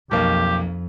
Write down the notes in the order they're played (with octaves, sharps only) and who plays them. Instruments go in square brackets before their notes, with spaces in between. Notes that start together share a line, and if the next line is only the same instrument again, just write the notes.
[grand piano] B1 A#3 [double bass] F2 [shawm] G4